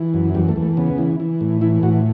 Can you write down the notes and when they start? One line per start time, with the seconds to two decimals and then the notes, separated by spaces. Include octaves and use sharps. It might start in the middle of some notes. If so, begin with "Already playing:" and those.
Already playing: E3
0.14 F#2
0.35 E2 G3
0.49 A3
0.56 E2
0.62 A3
0.77 C#3 B3
0.98 E3
1.20 E3
1.41 A2
1.61 E3 E4
1.83 A2 F#4